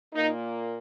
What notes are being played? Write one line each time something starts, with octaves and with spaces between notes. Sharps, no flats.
A#2 A#3 D#4